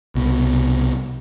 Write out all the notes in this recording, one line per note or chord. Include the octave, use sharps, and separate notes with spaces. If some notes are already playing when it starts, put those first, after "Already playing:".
C2 B2